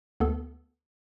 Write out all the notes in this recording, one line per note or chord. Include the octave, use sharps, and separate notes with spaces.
D2 B3 A4